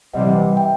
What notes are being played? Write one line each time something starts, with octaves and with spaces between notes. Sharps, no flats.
C3 E3 G3 C4 D#5 F#5
E5 G5